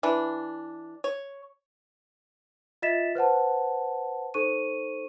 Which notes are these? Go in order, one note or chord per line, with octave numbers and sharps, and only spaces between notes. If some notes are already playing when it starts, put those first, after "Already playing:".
E3 D4
C#5
F4 D#5 E5 A6 B6 E7
B4 C5 F#5 A5
D#4 A4 C5 C#6 D#7